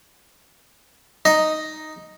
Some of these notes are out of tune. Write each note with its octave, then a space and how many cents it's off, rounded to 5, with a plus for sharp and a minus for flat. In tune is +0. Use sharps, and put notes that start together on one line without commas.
D#4 +0 D#5 +0